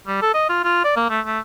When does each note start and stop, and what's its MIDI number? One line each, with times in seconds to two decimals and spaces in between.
0.07 0.20 55
0.22 0.33 69
0.34 0.45 75
0.49 0.60 65
0.64 0.82 65
0.84 0.93 74
0.96 1.09 58
1.10 1.21 57
1.26 1.40 57